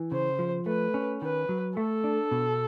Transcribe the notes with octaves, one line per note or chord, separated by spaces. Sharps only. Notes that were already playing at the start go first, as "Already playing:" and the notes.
Already playing: E3
C#3 C5
F3
A3 B4
C#4
D#3 B4
F#3
A3 A4
D4
B2